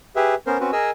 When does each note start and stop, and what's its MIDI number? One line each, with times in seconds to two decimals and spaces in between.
0.16 0.35 67
0.16 0.35 68
0.16 0.35 71
0.16 0.35 76
0.47 0.58 59
0.47 0.58 61
0.47 0.58 70
0.47 0.58 72
0.60 0.71 60
0.60 0.71 61
0.60 0.71 66
0.60 0.71 71
0.72 0.90 68
0.72 0.90 70
0.72 0.90 75
0.72 0.90 80
0.72 0.90 88